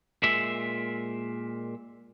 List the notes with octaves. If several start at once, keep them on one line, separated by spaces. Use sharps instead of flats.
A#2 G#3 E5